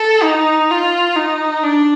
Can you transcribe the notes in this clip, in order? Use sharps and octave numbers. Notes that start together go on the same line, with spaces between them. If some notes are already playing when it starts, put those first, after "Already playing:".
Already playing: A4
D#4
F4
D#4
D4